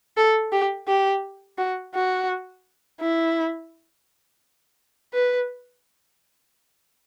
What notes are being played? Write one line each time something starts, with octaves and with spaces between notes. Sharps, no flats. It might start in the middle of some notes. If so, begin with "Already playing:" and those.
A4
G4
G4
F#4
F#4
E4
B4